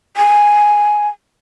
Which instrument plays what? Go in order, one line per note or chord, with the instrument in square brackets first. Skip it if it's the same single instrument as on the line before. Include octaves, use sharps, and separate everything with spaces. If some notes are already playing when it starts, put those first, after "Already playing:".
[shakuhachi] G#5